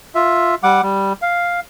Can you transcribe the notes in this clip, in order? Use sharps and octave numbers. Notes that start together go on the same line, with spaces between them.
F4 E5
G3 F#5 D6
G3
F5